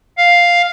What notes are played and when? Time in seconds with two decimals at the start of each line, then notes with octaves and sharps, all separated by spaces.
0.18 F5